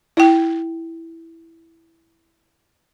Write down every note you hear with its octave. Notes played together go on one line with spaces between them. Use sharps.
E4 G5